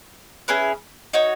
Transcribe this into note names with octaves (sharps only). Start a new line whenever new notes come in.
C#4 E4 G#4 B4
D#4 F#4 C#5